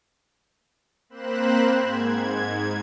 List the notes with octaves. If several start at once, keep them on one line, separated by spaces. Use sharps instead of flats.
A#3 C4 C5 B5 F#6 E7
G#2 G#6